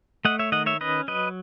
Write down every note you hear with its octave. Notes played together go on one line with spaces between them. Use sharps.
A3 D#5 F#5
C#5 E5
D#3 D#5 F#5
C#5 E5
C#4 B4 D#5
F#3 B4 D#5